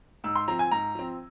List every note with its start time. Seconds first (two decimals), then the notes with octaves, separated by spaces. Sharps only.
0.24 G#2 E6
0.36 C6
0.48 F3 C4 A#5
0.59 G#5
0.71 G#2 A#5
0.95 F3 C4